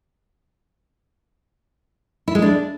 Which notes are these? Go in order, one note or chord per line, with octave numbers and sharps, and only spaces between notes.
E4
G#3
D4